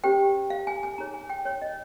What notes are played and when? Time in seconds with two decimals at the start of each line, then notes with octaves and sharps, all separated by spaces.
0.04 C#4 G4 C5 G5
0.50 F5
0.67 G#5
0.83 G#5
0.98 D#4 G#4 C#5 A#5
1.14 G#5
1.30 G5
1.45 C#5
1.62 D#5